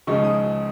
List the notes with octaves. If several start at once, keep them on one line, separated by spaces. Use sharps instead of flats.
C#2 C#3 F3 G#3 D#4 C#6
D#6